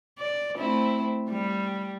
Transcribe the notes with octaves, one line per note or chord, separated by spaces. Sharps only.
D5
A3 C4 E4
G3